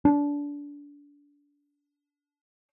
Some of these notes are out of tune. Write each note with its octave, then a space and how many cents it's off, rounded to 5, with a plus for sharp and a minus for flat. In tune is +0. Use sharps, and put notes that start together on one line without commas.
D4 -25